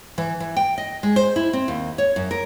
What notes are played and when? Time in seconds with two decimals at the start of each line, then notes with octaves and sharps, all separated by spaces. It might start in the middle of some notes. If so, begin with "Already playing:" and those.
0.18 E3
0.40 E3
0.57 G5
0.78 D#5
1.03 G#3
1.16 C5
1.36 E4
1.53 C4
1.68 D#2
1.98 C#5
2.16 F#2
2.31 A#4